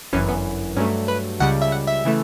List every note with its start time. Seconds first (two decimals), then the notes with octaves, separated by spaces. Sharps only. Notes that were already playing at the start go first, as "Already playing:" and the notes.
0.13 G1 F#2 E3 C#4
0.29 B3
0.76 G2 F#3 A3 C#4
1.08 B4
1.40 C#2 C#3 G3 F#5
1.62 E5
1.72 F#5
1.87 E5
2.05 C#3 E3 A3